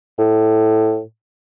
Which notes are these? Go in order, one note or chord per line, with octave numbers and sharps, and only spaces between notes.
A2